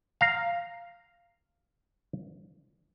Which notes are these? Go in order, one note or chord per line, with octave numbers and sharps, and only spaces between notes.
F5 A#5